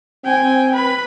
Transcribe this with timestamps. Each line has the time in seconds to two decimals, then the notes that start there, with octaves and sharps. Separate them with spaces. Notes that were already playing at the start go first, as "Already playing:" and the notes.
0.25 C4 G5 G#5
0.74 B4 B5